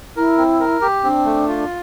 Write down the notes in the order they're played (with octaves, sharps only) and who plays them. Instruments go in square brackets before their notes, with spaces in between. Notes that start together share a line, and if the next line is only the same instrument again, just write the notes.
[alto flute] E4 [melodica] A#4
[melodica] C4
A#4
G4
[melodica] C4 [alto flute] D4
[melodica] A3
F4